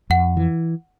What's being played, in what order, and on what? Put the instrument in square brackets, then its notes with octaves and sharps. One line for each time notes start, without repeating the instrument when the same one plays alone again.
[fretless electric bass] F2 [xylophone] F#5
[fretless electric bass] E3